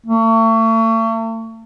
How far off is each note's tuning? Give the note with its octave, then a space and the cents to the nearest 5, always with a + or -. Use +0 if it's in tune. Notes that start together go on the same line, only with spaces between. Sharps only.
A3 +40